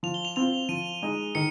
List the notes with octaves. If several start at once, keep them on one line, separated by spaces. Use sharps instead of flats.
F3 F7
G7
F7
C4 F4 F7
F3 D#7
G#3 D#4
D#3 C#7